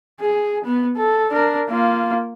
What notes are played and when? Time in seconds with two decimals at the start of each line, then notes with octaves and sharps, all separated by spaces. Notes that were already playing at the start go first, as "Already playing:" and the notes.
0.20 G#4
0.65 B3
0.97 A4
1.31 D4 A#4
1.69 A#3 F4